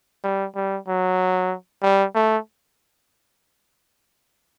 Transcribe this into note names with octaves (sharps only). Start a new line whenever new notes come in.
G3
G3
F#3
G3
A3